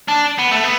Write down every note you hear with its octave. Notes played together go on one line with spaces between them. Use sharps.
D4
B3
A3
B3